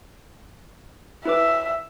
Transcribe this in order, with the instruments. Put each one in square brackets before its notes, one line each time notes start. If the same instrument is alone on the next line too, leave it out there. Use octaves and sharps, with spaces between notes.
[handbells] E4 B4 D6 [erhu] E5